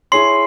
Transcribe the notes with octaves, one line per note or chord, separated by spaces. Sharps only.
E4 G#4 C#5 C6 C7